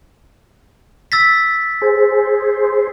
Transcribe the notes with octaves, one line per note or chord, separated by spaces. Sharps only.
E6 A6 B6
G#4 C5